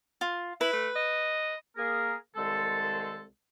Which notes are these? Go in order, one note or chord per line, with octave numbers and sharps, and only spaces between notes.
F4
E4 B4
A3
D#5
A#3 G#4 A#4
C2 D#3 G#3 C4 A4